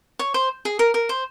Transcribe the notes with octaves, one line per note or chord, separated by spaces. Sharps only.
C#5
C5
G#4
A#4
A#4
C5